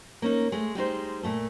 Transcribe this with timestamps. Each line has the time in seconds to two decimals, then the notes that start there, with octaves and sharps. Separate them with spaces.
0.22 A#3 C#4 D#4
0.52 G#3 A3
0.75 G3 G#3 D#4 C5
1.23 A#2 A3 A4